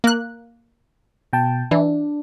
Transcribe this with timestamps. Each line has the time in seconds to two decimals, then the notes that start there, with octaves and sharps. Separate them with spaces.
0.04 A#3 F#6
1.33 B2 G5 A5
1.71 E3 D4